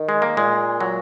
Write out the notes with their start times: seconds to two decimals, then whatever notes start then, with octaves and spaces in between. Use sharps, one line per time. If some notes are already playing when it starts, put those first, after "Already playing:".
Already playing: D#3
0.09 G#3
0.22 A#3
0.37 A#2 G#3
0.80 F#3